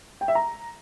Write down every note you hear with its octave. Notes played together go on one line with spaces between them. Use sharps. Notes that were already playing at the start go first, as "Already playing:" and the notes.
G5
E5
A#5